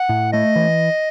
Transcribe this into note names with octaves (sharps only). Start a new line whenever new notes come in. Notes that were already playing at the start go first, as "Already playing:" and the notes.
Already playing: F#5
A2
A3 D#5
E3